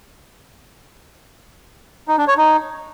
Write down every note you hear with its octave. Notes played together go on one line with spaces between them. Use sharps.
D#4
D4
C#5
D#4